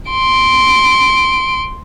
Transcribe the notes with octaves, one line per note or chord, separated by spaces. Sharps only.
C6 D7